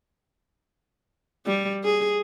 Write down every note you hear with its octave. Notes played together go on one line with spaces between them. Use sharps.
G3
G#4